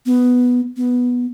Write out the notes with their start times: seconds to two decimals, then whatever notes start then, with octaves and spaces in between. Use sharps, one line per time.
0.06 B3
0.77 B3